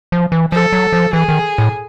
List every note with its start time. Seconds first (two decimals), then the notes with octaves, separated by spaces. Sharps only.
0.12 F3
0.32 E3
0.52 F3 A4
0.73 F#3
0.93 F3
1.13 E3 G#4
1.29 D#3
1.58 A2